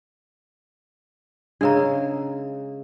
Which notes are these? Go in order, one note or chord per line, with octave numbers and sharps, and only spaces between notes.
C#3 G#3 D4 A#4 A#5